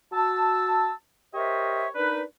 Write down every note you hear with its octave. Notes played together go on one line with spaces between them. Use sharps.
F#4 A5 E6
G4 A#4 C5 C#5 D#5 E5
D4 D#4 A#4 B4